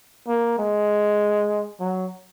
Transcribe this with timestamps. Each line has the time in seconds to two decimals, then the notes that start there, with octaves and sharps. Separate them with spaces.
0.28 A#3
0.58 G#3
1.80 F#3